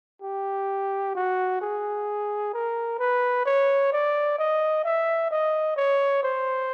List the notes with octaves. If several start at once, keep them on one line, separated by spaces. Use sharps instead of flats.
G4
F#4
G#4
A#4
B4
C#5
D5
D#5
E5
D#5
C#5
C5